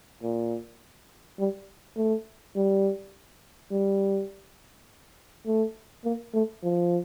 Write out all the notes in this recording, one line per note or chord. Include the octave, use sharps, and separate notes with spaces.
A#2
G3
A3
G3
G3
A3
A#3
A3
F3